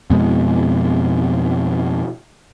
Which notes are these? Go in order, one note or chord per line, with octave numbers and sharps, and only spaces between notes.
F2 B2 G#3